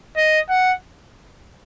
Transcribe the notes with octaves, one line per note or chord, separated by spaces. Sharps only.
D#5
F#5